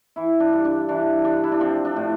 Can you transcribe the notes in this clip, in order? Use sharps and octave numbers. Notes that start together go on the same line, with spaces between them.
E3 E4
D4
G2
D4
E3 D4
G2 D4
E4
D4
F3 C4
D4
A2